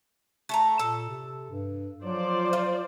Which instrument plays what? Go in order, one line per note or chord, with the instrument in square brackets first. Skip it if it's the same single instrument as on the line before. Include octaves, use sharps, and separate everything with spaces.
[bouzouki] A3 A5 A#5
[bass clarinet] A#2 [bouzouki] A4
[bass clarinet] C3
G2
[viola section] F3 C5 D5 [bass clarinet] F#3
[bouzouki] F4